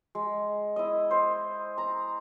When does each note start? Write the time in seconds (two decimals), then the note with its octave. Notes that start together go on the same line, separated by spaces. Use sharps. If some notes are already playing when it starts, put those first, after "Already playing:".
0.15 G#3
0.76 E4 D#5
1.11 C5
1.78 A#5